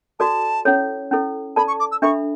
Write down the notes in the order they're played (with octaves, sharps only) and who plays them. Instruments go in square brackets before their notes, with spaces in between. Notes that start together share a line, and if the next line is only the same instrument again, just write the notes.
[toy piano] F#4 A4 D5 [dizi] A5
[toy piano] C#4 E4 A4 C#5
C#4 E4 A4
[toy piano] A4 D5 A5 [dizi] B5
[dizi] C#6
D6
E6
[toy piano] D4 A4 E5 B5 [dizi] C#6